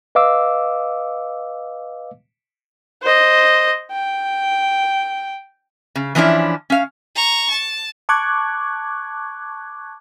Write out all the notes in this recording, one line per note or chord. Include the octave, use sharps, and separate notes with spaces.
B4 D#5 F5 D6 E6
C5 D#5
G5
C#3
E3 F3 C#4 D4 E4
C#4 F5
A#5 C#6
A5
A5 C#6 D6 F#6 G#6